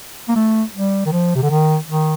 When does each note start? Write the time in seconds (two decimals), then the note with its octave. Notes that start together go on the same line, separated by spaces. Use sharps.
0.29 A#3
0.36 A3
0.75 G3
1.06 D#3
1.12 F3
1.35 C3
1.43 D3
1.50 D#3
1.88 D#3